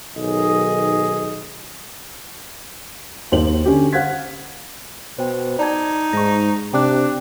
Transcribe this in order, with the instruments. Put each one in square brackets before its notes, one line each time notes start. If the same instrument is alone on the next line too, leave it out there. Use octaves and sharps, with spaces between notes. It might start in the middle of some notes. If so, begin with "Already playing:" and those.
[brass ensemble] B1 D#3 G#4 D#5
[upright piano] D#2 C5 F#7
D3 C#4 G4
C5 F5 F#5 F#6 G#6 B6
[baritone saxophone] B2 [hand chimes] C5 G5
[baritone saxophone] D#4 [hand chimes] D5 A5 G#6
[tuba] G#2 [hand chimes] C#6 A#6
[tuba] C3 [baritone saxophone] D4 [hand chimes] G5 D6 F#6